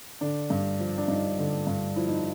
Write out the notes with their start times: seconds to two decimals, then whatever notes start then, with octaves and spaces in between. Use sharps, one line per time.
0.21 D3 D4
0.50 G2
0.80 F3
0.98 D4
1.08 G2 D#4
1.38 D3
1.67 G2
1.96 F3 E4
2.09 D#4